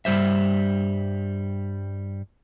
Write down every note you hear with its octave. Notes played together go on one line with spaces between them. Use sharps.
G2 G3 C5 E5